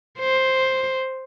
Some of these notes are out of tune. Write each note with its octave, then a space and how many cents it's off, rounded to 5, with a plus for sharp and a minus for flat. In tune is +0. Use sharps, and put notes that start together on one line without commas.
C5 +5